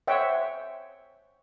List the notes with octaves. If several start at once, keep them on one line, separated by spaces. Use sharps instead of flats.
C5 C#5 E5 F#5 G5